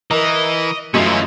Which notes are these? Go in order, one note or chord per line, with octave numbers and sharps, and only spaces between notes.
E3 A#4 D#5
F#2 C#3 E3 A3 C#4 F4 D#5